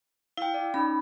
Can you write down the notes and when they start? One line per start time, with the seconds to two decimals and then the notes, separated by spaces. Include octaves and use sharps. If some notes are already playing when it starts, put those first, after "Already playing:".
0.37 E4 F5 G5
0.54 D5
0.74 C#4 D#4 B5